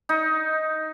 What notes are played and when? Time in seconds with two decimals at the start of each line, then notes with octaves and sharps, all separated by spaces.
0.09 D#4